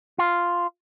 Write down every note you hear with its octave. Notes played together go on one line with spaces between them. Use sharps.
F4